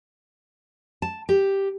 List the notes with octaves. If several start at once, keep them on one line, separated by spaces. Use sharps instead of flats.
A5
G4